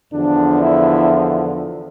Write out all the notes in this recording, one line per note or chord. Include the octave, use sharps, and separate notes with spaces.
E2 D3 F3 D4
E4